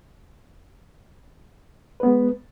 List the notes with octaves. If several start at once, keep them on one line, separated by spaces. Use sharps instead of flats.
G#3 B3 B4